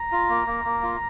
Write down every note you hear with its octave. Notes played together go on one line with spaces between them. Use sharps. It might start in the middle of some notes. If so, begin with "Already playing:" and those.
Already playing: A#5
F4
A#3
A#3
A#3
F4